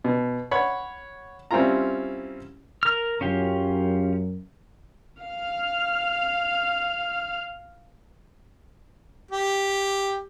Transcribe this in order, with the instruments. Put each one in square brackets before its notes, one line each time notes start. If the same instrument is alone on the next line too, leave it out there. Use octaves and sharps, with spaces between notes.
[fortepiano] B2
C#5 F#5 B5
G3 C4 C#4 E4 F4 A#5
[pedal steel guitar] A#4 F6
[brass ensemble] F#2 [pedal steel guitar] C#4 F4 G4
[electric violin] F5 F6
[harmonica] G4